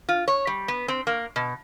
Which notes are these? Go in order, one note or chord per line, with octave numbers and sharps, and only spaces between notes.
F4
C#5
G3
B3
C4
A#3
B2